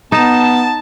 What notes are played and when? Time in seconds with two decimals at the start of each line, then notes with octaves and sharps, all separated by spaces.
0.12 B3 D#4 A5